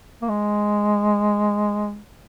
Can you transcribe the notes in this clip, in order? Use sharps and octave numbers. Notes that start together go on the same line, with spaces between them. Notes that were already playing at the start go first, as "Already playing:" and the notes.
A#3
G#3